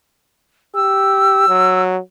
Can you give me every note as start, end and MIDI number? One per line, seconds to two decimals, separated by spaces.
0.75 1.45 67
0.75 1.82 88
1.49 1.99 54